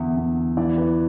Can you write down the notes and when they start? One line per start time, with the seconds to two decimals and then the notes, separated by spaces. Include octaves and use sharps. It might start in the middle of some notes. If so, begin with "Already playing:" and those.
Already playing: E2 D3 E5
0.17 E2
0.57 E3 D5
0.78 B4